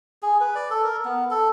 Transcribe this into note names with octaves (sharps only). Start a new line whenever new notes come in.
G#4
B4
D5
A4
A#4
B3
A4